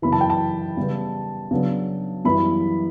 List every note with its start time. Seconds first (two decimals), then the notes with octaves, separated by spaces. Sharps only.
0.02 F#2 C#3 E3 B5
0.12 A5
0.21 G5
0.30 A5
0.77 C#3 G3 B3
1.51 C#3 F#3 B3 D4
2.25 F#2 E3 G3 B3 E4 B5